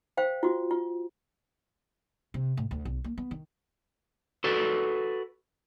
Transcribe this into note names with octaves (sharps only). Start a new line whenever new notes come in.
C5 F5 G5
F4 F#4
F4
C3
A2
D2
B1
A#3
B3
D#3
F#4 A4 B4 D5